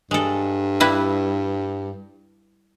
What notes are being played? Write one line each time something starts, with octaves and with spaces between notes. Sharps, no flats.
G2 G#3 A4
G3 E4 B4